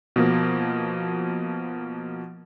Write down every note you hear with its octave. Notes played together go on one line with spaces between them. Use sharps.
B2 F3 A#3